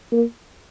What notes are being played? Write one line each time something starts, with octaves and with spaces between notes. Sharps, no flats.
A#3